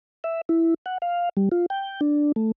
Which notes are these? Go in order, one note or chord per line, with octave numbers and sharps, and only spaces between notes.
E5
E4
F#5
F5
G3
F4
G5
D4
A3